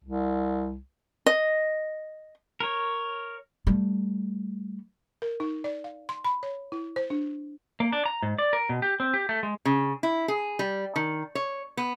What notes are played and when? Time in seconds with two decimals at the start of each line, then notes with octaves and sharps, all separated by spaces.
0.04 C2
1.26 D#5
2.60 A#4 C#5
3.67 G3 A3
5.22 A#4
5.40 D#4
5.64 D5
5.84 F5
6.09 C6
6.24 B5
6.43 C#5
6.72 E4
6.96 C5
7.10 D4
7.80 A#3
7.93 D4
8.06 A#5
8.23 G#2
8.38 D5
8.53 A#4
8.69 B2
8.82 G4
9.00 C4
9.14 G4
9.29 A3
9.43 G#3
9.65 C#3
10.03 E4
10.28 G#4
10.59 G3
10.96 D#3
11.35 C#5
11.77 B3